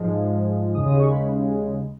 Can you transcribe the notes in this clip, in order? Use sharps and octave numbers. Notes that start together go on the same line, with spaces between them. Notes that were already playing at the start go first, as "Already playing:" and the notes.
Already playing: G#2 F3 G#3
D#2 C#3 G#3 D#6
D#6
C#6
B5